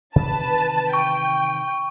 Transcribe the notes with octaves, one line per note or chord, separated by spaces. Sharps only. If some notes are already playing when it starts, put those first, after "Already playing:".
C3 D#3 E3 B4 A5
G5 C#6